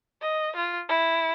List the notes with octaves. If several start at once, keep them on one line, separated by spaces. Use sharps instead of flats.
D#5
F4
E4